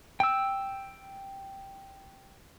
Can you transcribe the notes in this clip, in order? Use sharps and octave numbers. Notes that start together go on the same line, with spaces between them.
G5 E6